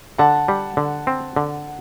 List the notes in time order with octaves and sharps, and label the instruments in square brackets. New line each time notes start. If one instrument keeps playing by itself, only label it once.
[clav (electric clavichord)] D3 [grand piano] F#5 A5
[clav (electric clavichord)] G3
D3
C4
D3